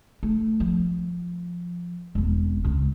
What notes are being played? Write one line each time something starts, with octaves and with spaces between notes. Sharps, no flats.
A3
F3
E1 C4
C#2 C#3